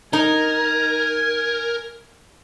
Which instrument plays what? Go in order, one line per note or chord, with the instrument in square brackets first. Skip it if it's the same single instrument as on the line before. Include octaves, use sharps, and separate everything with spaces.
[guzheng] D#4 [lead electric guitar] A#4 [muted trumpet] G#5